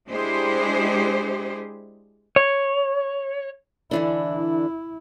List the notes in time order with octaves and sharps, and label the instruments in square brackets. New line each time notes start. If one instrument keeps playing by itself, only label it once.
[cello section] G#3 D4 E4 G4 G#4 C5
[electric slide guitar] C#5
[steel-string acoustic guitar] D3 E3 D4 [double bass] E4